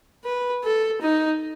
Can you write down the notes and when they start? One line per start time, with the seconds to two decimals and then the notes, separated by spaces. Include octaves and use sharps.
0.25 B4
0.64 A4
1.01 D#4